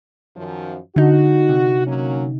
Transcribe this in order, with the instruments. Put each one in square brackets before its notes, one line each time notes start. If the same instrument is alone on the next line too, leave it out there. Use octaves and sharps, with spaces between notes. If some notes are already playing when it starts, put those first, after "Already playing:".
[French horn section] F#2 D#3 F3
[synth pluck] D3 D#4 [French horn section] F#4
[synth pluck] C3
[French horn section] F#3 A#3 C#4